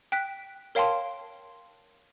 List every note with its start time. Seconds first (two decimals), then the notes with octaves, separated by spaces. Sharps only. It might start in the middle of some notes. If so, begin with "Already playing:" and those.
0.12 G5 F#6 B6
0.75 A#4 C#5 F5 G5 A5 C6